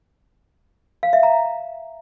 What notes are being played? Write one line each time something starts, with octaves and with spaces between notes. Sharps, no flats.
F5
E5
A#5